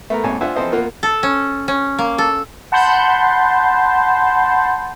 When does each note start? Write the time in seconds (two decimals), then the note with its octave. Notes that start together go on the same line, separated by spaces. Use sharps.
0.10 A3 B3 A#4 A#5
0.24 A#1 F2 G#2 C#5 G#5 A5
0.41 D4 F4 C5 E5 F#5 G#5
0.56 E3 F3 C4 A4 C5 D#5
0.71 E2 A#3 F4 F#5
1.03 A4
1.23 C#4
1.68 C#4
1.99 A#3
2.18 A4
2.72 F#5 A5 B5 C6 G6